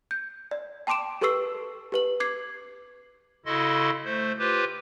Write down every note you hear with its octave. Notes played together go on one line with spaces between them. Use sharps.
G6
D5
G5 A5 C6 D6 D7 E7
G4 A4 B4 C#6 E6 C7
G4 B4 F#7
D6 G#6 C7
C#3 E4 F#4 A4 D#5 C6
A3 C5
F4 G4 B4 C5